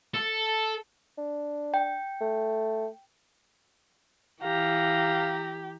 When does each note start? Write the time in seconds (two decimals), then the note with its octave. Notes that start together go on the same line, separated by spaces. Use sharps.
0.14 A4
1.18 D4
1.74 G5
2.21 A3
4.43 E3 G4 F5 A#5